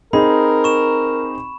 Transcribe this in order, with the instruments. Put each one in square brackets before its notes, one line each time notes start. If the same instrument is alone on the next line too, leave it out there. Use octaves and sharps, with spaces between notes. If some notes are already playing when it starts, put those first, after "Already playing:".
[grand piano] C4 D#4 G#4 [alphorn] A#4 [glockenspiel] B5
[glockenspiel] C#6 E7